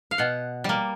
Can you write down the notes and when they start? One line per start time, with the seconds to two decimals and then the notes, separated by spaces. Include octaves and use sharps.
0.11 F5
0.18 B2 F#5
0.64 G3 A#3